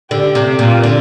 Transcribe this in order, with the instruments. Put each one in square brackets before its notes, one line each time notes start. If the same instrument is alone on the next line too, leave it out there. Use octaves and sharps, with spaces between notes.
[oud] D3 [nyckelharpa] G4
[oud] C3
A#2
D3